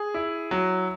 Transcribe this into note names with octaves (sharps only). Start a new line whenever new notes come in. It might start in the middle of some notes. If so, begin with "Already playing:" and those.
Already playing: G#4
E4
F#3